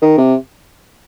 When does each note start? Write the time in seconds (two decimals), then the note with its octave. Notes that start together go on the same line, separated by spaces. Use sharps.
0.02 D#3
0.18 C3